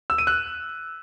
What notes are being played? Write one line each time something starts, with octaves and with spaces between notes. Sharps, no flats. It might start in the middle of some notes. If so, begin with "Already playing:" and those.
E6
D#7
F#6